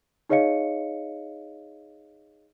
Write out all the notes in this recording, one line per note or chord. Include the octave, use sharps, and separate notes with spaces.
D#4 G#4 C#5 D#5 F5 C#7